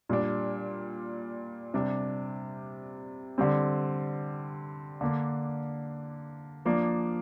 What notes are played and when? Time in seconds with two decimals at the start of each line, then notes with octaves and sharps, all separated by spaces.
0.09 A#2 G3 D4
1.74 C3 G3 D4
3.38 D3 G3 C4
5.01 D3 A#3 D4
6.65 F3 A#3 D4